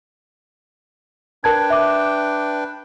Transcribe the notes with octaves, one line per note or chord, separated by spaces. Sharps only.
D4 A#4 B4 G5 A5 G#6
E5 D6